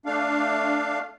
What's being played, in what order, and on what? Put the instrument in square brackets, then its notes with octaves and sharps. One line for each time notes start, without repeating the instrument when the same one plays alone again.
[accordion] A3 D4 F5